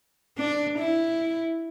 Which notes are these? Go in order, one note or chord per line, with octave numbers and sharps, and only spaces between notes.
D4
E4